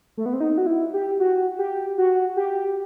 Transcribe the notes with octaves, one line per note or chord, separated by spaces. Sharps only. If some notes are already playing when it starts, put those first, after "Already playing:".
A3
B3
C4
D#4
F#4
E4
G4
F#4
G4
F#4
G4